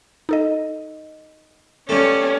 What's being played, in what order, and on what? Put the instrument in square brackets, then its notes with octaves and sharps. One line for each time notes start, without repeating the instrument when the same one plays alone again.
[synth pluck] D#4 A4 D#5
[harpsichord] G2 A3 [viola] C#4